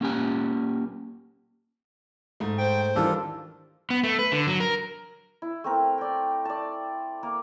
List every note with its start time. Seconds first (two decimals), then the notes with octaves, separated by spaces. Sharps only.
0.01 A#3 C#4 G4 G#5
2.40 G#2 A3
2.58 C5 G5
2.96 D#3 E3 G3 D4 F4 A4
3.90 B3
4.03 A3
4.19 B4
4.32 D3
4.47 F#3
4.60 A#4
5.42 E4
5.64 A3 C4 A#4
5.98 D5 G5
6.45 D5 A5
7.23 A#3 A#4